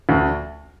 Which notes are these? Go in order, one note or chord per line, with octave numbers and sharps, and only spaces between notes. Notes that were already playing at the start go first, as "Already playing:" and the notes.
D2